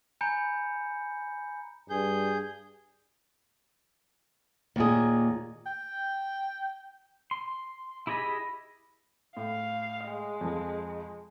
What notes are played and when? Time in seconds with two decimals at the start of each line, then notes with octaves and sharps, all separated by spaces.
0.21 G#5 A#5 B5 G6 C#7
1.90 G2 G#4 G6
4.76 D#2 A#2 G#4
5.66 G5
7.31 C6
8.07 E4 G4 G#4 D#5 B5
9.37 A2 F5
10.06 G#3
10.41 F2 F3